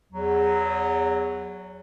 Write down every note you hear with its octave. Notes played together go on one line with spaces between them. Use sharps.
E2 F#3